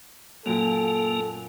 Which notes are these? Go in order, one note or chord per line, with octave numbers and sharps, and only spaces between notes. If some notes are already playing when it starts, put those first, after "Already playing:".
F#2 A#2 A#3 A4